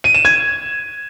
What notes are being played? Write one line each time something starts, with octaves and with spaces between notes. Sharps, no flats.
D#7
E7
G#6